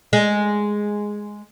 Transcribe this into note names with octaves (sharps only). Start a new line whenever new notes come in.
G#3